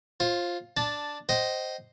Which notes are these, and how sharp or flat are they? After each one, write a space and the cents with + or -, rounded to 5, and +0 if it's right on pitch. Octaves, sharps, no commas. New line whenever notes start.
F4 +0 C5 +30
D4 +0 A5 -5
C5 +0 D#5 +0 G5 -45